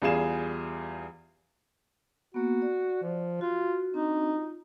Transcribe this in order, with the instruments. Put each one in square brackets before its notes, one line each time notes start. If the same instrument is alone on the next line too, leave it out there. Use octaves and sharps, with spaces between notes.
[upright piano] E2 G3 F4 G#4 E7
[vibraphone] A#3 B3 [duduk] F#4
[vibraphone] D5
[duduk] F3
[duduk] F4 [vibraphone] F#4
[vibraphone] C4 D4 F#4 [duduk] D#4
[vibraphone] F4